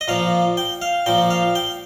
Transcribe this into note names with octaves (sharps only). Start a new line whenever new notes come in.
D#5
A#2 F3 F5
G5
F5
A#2 F3 G5
F5
G5